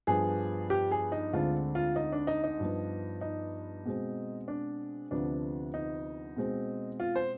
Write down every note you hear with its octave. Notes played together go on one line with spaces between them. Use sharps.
G2 F3 B3 G#4
G4
G#4
D#4
D2 D3 G#3 C4 F4
F4
D#4
D4
D#4
D#4
G2 F3 B3
D#4
B2 G#3 C4
D4
D2 C3 F3 B3 D4
D#4
B2 G#3 C4
F4
C5